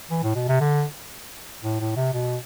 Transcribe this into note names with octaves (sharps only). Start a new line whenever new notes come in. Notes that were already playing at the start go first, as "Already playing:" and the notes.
E3
A2
B2
C3
D3
A2
A2
C3
B2